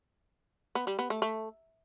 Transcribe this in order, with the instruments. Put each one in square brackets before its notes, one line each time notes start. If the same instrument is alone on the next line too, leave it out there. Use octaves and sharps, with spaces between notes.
[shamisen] B3
G3
B3
A3
A3